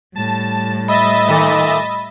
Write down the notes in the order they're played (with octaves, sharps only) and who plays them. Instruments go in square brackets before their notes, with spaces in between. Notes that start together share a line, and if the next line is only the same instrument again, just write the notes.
[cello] A2 G3 [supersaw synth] A5
[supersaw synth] D#5 E5 A6 [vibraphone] B5
[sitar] A#2 D#3 A4